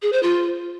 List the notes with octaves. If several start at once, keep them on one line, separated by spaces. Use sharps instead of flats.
G#4
C5
F4